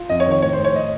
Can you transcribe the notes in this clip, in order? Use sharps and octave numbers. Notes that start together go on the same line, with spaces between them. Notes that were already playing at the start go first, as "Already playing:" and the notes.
Already playing: F4
F2 D#5
C#5
D#3
C#5
A2 C#5
C5
A2
C#5
D#5